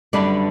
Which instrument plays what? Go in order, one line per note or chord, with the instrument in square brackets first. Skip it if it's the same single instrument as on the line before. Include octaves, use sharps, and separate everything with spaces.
[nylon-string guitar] F#2 D3 G3 D4 B4 D5